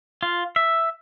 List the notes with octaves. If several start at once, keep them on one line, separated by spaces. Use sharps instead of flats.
F4
E5